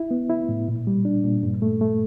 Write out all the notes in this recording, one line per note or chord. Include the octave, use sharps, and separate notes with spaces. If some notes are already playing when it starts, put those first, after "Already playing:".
Already playing: E4
B3
E4
A2
A#2
G3
D4
A#2
G2
A3
A3